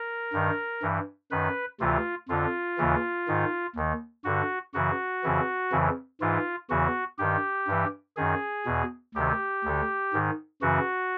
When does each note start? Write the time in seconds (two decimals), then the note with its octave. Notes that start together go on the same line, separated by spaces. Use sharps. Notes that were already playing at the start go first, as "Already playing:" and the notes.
Already playing: A#4
0.33 G2 D#3
0.82 G2 E3
1.31 F#2 D#3 B4
1.80 D2 C3 E3 F4
2.29 F2 D3 F4
2.78 D#2 C#3 E3
3.28 G#2 D#3
3.76 D#2 D#3
4.24 G2 D3 F#4
4.74 F#2 C#3 E3 F#4
5.24 F2 C#3 E3
5.72 F2 C#3 E3
6.21 G#2 E3 F4
6.70 E2 C#3 E3 F#4
7.18 G2 D#3 G4
7.67 G2 E3
8.16 F#2 D#3 G#4
8.65 E2 B2
9.14 D2 C3 D#3 G4
9.65 D2 D3
10.13 G#2 D#3
10.62 F#2 C#3 E3 F#4